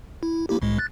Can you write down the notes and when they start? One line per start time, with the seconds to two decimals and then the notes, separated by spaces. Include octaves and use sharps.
0.23 E4
0.49 A#3 E4 G4
0.62 C2 A2 G#3
0.79 F#6 A6